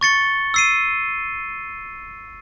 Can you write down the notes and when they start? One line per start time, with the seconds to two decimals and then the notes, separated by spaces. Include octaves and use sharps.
0.01 C#6 A6 C#7 G7
0.54 E6 C7 D#7